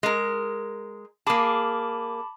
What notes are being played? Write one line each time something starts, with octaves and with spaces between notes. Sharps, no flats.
G#3 A#4
A#3 G#4 A5 B5 D6